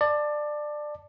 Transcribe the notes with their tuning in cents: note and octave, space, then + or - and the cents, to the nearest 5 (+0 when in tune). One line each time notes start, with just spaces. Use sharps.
D5 +20 A5 +0